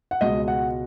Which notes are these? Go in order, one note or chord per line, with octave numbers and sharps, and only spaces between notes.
F#5
C#2 B2 G#3 D#5
F#5